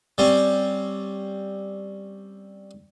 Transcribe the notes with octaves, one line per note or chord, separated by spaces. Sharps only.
G3 C4 C#4